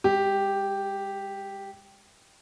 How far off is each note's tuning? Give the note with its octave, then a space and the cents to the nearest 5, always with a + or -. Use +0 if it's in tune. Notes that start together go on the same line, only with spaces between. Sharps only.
G#3 -40 G4 +0